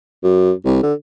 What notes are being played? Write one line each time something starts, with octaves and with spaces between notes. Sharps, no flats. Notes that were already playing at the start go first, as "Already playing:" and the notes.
F#2
C2
D3